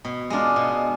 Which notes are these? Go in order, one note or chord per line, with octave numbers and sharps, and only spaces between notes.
B2
G#3 D4 F4
B2